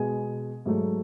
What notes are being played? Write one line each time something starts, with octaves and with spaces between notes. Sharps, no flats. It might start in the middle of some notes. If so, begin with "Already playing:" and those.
Already playing: B2 G#3 G#5
G#2 F#3 A3